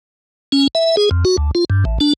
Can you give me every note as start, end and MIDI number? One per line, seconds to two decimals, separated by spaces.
0.52 0.68 61
0.75 0.96 76
0.97 1.09 68
1.11 1.24 41
1.25 1.37 66
1.38 1.51 38
1.55 1.65 65
1.70 1.84 43
1.85 1.98 33
2.00 2.13 62